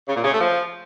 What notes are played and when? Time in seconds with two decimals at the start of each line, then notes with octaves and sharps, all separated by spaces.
0.08 C#3
0.16 A#2
0.24 C#3
0.33 A3
0.41 F3